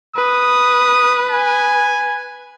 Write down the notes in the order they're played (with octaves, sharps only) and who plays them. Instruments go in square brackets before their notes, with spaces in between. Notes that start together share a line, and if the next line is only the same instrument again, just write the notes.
[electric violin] B4 [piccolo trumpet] D#6
[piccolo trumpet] G#5